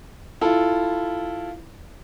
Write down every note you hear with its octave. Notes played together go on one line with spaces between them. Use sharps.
E4 F4 A4